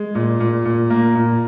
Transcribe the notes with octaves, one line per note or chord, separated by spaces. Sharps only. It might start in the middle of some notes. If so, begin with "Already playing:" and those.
Already playing: G#3
A#2
A#2
A#2
A#3
A#2